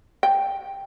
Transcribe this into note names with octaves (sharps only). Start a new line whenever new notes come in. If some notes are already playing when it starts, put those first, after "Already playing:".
G5